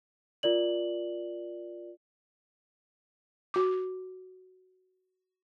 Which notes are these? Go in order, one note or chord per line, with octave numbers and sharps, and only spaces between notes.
F4 A#4 D5 F#7
F#4 D6